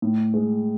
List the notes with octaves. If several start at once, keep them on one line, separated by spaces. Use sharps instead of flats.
A2
G#3